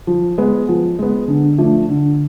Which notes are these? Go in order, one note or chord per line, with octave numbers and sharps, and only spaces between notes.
F3
G#3 B3
F3
G#3 B3
D3
F3 A3 D4
D3